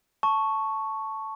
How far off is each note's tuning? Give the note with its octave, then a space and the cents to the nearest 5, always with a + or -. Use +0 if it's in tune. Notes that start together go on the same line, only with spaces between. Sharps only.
A5 +0 C#6 +0